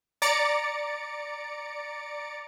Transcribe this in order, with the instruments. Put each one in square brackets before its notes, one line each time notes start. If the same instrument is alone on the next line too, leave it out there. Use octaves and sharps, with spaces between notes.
[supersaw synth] D5 A#5 A6 C#7 D7